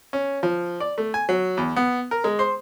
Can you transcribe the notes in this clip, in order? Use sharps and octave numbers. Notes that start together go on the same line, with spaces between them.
C#4
F3
D5
A3
G#5
F#3
E2
B3
A#4
G#3
C5